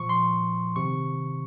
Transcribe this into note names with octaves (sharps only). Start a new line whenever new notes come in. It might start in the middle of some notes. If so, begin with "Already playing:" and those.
Already playing: A#2 F3 C#6
C6
C3 D#3 C#6